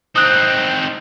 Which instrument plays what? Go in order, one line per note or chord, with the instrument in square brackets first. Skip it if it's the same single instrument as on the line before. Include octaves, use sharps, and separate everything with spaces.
[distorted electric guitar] C4 D#4 [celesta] D#6 F#6